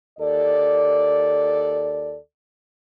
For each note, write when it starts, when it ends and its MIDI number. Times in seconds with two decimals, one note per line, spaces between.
0.19 2.17 39
0.19 2.17 69
0.19 2.17 74